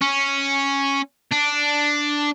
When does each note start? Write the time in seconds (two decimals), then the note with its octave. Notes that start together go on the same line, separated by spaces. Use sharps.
0.02 C#4
1.31 D4